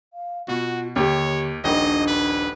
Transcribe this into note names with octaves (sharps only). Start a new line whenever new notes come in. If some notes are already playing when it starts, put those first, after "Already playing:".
F5
B2 F4 F#4
D#2 D3 G4 C#5
D#1 A#1 D#3 D4 D#5
B4